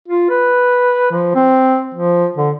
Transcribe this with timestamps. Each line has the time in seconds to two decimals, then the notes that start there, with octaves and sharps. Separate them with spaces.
0.08 F4
0.30 B4
1.11 F3
1.35 C4
1.95 F3
2.37 D3